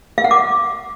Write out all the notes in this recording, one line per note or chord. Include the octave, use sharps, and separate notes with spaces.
F5
F#5
D6